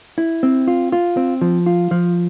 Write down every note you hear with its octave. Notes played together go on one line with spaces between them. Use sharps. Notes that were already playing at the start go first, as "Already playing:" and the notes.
E4
C4
F4
F4
C4
F3
F4
F3